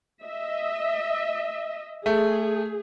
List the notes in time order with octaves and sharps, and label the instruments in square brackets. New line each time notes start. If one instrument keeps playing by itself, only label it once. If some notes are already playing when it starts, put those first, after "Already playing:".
[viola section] D#5 E5
[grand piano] A3 [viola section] G#4